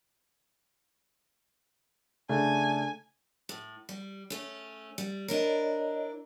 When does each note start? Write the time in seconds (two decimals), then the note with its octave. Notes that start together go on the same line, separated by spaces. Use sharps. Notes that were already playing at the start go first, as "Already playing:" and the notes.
2.29 C#3 A3 D4 G#5
3.49 A2
3.89 G3
4.30 A3 C#4
4.98 G3
5.28 D4 E4 A#4 C#5 D#5